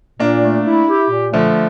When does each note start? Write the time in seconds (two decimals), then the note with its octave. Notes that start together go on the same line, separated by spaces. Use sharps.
0.19 A#2 A#3 D4
0.42 A3
0.66 E4
0.88 G4
1.10 A#2
1.32 D3 F3 A3